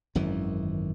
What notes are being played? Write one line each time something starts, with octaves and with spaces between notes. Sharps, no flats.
G#1 F#2 D#3 E3